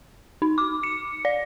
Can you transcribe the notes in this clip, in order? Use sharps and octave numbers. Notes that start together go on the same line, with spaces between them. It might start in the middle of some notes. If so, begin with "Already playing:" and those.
D#4
D6
C#7
D5